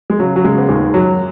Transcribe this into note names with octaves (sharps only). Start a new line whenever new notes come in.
G#3
C#3 F#3
F#3
C#3 G#3
B3
D#2 G#3
F#2 F#3